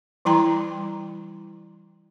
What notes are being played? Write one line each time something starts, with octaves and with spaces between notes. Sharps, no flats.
E3 G3 E4 G5 A#5 C6